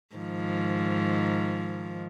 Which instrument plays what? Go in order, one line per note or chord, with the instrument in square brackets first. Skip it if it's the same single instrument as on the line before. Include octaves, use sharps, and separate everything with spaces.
[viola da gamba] G#2 D#3 F3